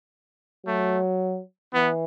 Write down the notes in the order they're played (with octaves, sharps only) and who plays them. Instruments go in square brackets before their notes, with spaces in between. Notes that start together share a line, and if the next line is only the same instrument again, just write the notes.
[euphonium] F#3 [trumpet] A3
[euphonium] E3 [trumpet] B3